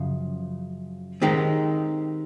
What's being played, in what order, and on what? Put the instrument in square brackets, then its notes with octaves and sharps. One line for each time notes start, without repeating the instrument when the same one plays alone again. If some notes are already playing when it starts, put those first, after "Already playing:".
Already playing: [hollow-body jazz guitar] F#2 C#3 F3
D#3 G#3 C4 D#4 G4